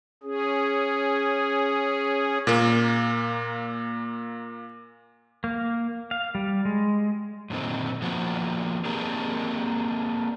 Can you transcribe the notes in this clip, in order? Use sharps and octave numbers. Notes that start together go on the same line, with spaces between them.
C#4 G#4
A#2 A#3
A#3
F5
G3
G#3
F#2 A#2 D3 D#3 C4
F3 A#3 B3 F#4
A#3 C4 D4 G4 G#4 A#4